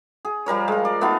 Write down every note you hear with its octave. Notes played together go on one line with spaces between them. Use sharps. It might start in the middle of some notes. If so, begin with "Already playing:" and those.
G#4
F3 G3 A#4 C#5
G#3 F4
D5
A3 B3 D#4 F4